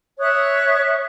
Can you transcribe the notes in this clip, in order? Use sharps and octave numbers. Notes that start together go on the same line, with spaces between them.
C#5 E5 D#6 F#6